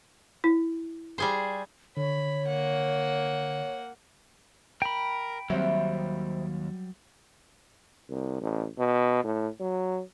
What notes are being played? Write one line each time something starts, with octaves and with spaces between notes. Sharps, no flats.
E4
G3 G#4 C5
D3 C#5 B5
A#3 F#5
A#4 G5 B5
D#2 F#3 G3 C4 C5 E5
C2
A1
B2
A2
F#3